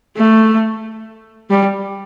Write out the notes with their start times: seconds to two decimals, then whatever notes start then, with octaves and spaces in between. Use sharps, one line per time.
0.17 A3
1.50 G3